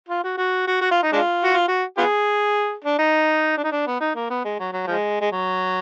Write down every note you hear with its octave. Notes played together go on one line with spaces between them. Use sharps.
F4
F#4
F#4
F#4
F#4
F4
D#4
G#3 D4 F4
F#4
F4
F#4
B3 F4 G#4
D4
D#4
D4
D#4
D4
B3
D#4
A#3
B3
G#3
F#3
F#3
F3 G#3
G#3
F#3